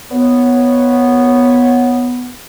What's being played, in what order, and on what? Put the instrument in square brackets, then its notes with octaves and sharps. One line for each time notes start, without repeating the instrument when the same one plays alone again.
[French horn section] D#2 C#5 [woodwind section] B3